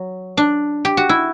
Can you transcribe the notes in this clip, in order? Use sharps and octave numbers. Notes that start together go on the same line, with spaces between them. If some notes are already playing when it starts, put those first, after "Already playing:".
Already playing: F#3
D4
G4
F#4
E4